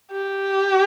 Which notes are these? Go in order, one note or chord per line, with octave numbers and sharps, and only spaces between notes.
G4